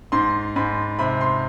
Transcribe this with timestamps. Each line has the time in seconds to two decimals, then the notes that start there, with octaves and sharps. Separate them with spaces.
0.12 G#2 C6
0.56 G#2 B5
0.99 C3 B5
1.21 C6